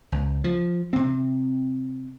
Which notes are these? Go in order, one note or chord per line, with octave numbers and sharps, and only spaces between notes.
C#2
F3
C3 C4